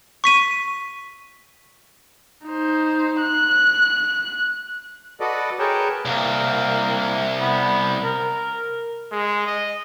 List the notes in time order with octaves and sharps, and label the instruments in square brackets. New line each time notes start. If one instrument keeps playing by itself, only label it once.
[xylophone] C#6 B6 D#7
[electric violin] D#4 C5
F#6
[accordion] F#4 A4 B4 D5 D#5
G#4 A#4 B4 C#5 G5 A5
[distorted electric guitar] C2 [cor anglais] A#3
[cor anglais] B3
A#4
[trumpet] G#3
D#5